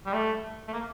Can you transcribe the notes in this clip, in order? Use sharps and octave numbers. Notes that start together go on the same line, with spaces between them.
G3
A3
A3
A#3